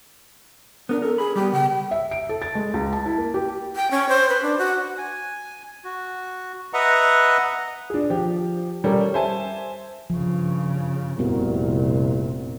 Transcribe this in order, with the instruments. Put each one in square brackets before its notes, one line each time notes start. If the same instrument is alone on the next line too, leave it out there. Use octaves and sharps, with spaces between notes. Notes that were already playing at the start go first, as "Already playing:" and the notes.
[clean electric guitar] B3 A#4 [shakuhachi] D4
[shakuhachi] A4 [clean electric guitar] A#4
[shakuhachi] G#4 [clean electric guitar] B5
[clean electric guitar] G3 B3 [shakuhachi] G4
[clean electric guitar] C#3 [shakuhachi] G5
[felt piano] E5
D7
A4
A6
G#3
C#2
A5
E4
A#3
G4
[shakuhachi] G5
C#4
C5
B4
D4
F#4
[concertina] G#5
F#4
B4 D#5 E5 F#5 A#5
[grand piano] D4 G#4
F3 G4
G3 C#4 A4 A#4 D5
C5 E5 G#5 A5
[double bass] G2 C#3 [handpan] F3
[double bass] F1 A#2 [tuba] C2 [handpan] B3 F#4 A#4